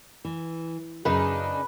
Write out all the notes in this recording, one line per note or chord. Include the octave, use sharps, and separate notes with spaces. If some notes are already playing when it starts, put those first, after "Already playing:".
E3
F#2 C#3 D4 D#4 B4